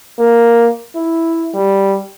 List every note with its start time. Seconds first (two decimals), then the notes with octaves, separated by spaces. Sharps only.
0.19 A#3
0.95 E4
1.54 G3